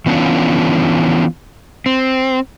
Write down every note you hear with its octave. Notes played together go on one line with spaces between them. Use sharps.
E3 B3 C#4 D4 F4
C4